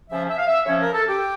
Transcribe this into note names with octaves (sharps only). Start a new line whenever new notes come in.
C#3 F3 C#4 E5
E5
F5
E5
C#3 F3 C#4 C#5
A#4
A4
G4